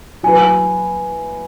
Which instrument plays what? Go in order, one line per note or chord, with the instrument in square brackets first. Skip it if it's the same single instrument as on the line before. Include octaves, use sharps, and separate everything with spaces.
[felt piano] F#3 E4 B4 [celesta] G#5